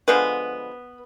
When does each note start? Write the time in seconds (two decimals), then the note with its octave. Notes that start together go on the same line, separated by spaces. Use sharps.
0.08 D3 F3 G#3 B3 B4